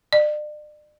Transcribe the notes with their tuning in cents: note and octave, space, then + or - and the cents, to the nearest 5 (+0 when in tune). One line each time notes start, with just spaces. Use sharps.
D5 +40